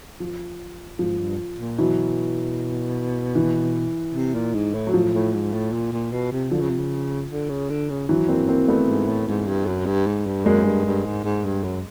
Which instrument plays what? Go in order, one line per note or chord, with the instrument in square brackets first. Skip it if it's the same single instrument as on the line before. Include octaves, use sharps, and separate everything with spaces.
[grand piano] F3
[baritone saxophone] G#2 [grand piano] F3
[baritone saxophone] G2
A#2
[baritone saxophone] B2 [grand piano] E3 F#3
[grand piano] E3
[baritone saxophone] C3
A#2
G#2
A2
[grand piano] F#3
[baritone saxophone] A2 [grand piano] F3
[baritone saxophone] A2
G#2
A2
A#2
A#2
B2
C3
[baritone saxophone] D3 [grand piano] F3
[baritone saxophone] C#3
C3
C#3
D3
C#3
D3
C#3
[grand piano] E3 F#3
A#3 C4
A#3 C4
A3 B3
[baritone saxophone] G#2
A2
G#2
G2
F#2
G2
G#2
G2
[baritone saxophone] F#2 [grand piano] G#3 A#3
[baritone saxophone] G2
G2
G#2
G#2
G2
F#2